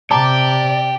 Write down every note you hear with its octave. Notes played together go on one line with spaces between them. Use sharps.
C3 G4 D5 A5 A#5 D6